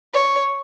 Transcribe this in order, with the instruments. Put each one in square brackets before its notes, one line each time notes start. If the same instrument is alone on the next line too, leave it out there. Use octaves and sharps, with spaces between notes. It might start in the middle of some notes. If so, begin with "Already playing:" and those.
[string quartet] C#5